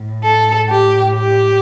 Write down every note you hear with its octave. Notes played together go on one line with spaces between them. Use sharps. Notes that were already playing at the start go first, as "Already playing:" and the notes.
Already playing: A2
A4
G4
G4